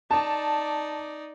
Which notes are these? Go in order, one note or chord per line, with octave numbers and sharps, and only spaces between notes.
D#4 D5 A5